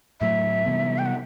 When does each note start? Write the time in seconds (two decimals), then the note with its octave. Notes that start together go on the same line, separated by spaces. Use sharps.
0.20 A2 F#3 A3 E5
0.66 C3 E3 G3 B3
0.98 G5
1.06 F#5